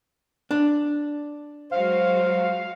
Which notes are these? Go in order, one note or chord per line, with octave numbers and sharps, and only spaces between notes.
D4
F#3 G#3 F#4 C5 F5